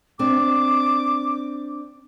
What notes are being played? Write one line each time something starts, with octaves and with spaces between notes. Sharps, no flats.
C4 D4 D6